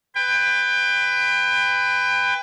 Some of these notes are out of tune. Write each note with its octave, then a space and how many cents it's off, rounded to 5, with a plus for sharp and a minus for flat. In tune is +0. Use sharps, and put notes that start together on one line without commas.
B4 +20 G5 +25